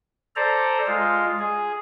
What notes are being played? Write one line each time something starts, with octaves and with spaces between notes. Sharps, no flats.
A4 C5 D5 A#5
G#3 F4
G#4